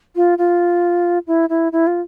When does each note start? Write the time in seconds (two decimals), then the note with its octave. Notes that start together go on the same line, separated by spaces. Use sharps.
0.16 F4
0.38 F4
1.27 E4
1.49 E4
1.72 E4
1.87 F4